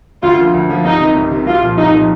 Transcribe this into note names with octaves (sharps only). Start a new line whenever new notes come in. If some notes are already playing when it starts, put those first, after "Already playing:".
D2 F4
D3 F3 A#3 F4
D2
D3 F3 A#3 F4
C2 D#4
C3 D#3
C2
C3 D#3
C2 F4
A#2 F3
C2 D#4
A#2 F3